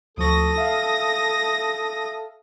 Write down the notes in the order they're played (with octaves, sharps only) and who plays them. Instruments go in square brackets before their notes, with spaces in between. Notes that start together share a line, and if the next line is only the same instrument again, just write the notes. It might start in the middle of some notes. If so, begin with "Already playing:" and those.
[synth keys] D2 F3 C#6 [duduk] A4 [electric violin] D#6 A#6
[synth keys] E5 F5